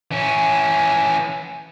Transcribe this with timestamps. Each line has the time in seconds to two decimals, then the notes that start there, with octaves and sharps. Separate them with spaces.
0.11 E3 C#4